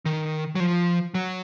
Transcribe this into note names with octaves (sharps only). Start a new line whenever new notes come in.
D#3
F#3
F3
F#3